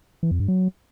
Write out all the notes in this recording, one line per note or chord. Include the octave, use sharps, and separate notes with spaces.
E3
F2
G2
F#3